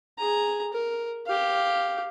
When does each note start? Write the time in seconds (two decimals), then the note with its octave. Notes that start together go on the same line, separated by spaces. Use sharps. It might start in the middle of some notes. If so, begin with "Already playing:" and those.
0.18 G#4 A#5
0.73 A#4
1.27 G4 F5